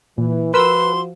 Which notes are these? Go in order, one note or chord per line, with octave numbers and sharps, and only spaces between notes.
A#2 E3
F3 F#4 A#4 B4 C6 E6